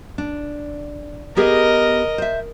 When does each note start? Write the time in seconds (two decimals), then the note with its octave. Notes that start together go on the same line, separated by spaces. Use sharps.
0.18 D4
1.37 B3 G4 G#4 A#4 D#5
2.18 C5 E5